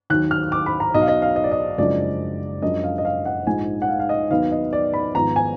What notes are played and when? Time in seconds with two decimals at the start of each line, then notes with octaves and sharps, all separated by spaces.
0.10 D#2 D#3 F#3 F#6
0.31 F6
0.52 D6
0.66 B5
0.80 A#5
0.94 B1 B2 F#3 D#5
1.02 F5
1.08 D#5
1.22 F5
1.36 D#5
1.44 D5
1.51 D#5
1.78 F#1 F#2 F3 G#3 D4 D5
2.62 F#2 F3 G#3 D4 D#5
2.84 F5
2.98 D#5
3.05 F5
3.26 F#5
3.46 A#1 G#2 F3 G#3 G#5
3.82 F#5
3.88 F5
4.00 F5
4.09 D#5
4.30 D#2 D#3 F#3 B3 F5
4.51 D#5
4.73 D5
4.94 B5
5.15 G#1 G#2 F3 B3 A#5
5.36 G#5